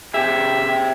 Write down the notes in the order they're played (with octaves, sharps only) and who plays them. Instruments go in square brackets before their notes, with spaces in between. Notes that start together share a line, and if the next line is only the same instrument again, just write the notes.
[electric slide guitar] C4 G4 G#4 [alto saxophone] E5